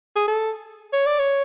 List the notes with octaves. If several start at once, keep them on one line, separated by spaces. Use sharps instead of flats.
G#4
A4
C#5
D5
C#5